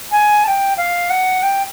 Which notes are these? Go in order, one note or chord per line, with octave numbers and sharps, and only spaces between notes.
G#5
A5
G5
F5
F#5
G5